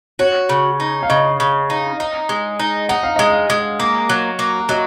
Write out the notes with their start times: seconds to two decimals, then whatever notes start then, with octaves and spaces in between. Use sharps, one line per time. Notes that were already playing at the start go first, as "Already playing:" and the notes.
0.19 F#4 C#5
0.49 C#3
0.80 D#4
1.03 F5
1.10 C#3 D#5
1.40 C#3
1.70 D#4
2.00 D#4
2.29 G#3
2.59 D#4
2.89 D#4 F#5
3.03 F5
3.16 G#3 D#5
3.30 F5
3.50 G#3
3.80 A#3
4.09 F#3
4.39 A#3
4.69 F#3 D#5